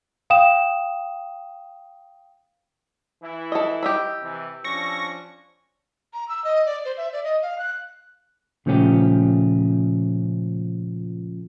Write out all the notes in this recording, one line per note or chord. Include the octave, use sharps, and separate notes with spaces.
F5 G5 D#6 E7
E3 E4
A4 D#5
G4 D#5 B5 E6
C3 E3
F3 C#4 D4 C#6 A#6
A#5
E6
D#5
D5
C5
E5
D5
D#5
F5
F#6
A#2 C#3 F3 A3 C#4 G4